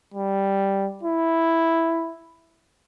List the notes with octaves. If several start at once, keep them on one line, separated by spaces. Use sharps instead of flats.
G3
E4